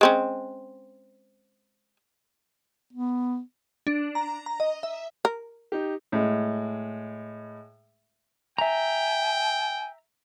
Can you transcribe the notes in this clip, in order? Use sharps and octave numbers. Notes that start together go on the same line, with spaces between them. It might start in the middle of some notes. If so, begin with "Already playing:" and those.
G#3 C4 C#4
B3
D4
A#5
A#5
D#5
E5
A#4
D#4 G4
A2 G#3
E5 G5 G#5 A#5